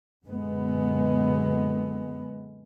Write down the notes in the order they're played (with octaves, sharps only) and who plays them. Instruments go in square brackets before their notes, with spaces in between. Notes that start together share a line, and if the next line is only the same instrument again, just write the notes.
[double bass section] F#2 A#2 D3 G#3 B3